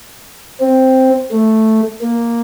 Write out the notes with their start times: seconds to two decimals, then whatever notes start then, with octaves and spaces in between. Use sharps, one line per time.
0.60 C4
1.31 A3
2.01 A#3